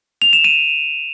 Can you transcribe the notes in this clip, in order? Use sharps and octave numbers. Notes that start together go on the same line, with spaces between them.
F7
E7
D#7